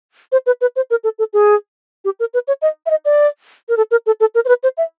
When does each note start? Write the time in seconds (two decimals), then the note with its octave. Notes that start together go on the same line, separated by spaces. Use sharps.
0.32 C5
0.46 B4
0.61 B4
0.76 C5
0.90 A#4
1.04 A4
1.19 A4
1.33 G#4
2.05 G4
2.20 A#4
2.34 B4
2.48 C#5
2.62 D#5
2.86 E5
2.90 D#5
3.05 D5
3.69 A#4
3.77 A4
3.91 A#4
4.06 A4
4.20 A4
4.35 A#4
4.45 C5
4.48 B4
4.63 C5
4.77 E5